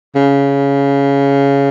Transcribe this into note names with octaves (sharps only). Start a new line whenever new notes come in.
C#3